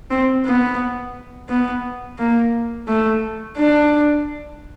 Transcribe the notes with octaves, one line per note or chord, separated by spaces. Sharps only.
C4
B3
B3
A#3
A3
D4